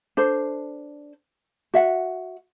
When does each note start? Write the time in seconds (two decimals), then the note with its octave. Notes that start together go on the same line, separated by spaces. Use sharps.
0.17 D4 A4 C5
1.74 F#4 E5 F#5